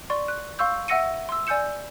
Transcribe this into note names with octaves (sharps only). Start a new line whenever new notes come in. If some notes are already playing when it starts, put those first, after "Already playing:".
D5 C6 C#6
F#6
F5 C6 C#6 E6 G6
E5 F#5 E6 A#6 C#7 D#7
C6 E6
D5 G#5 E6 G6 C#7 E7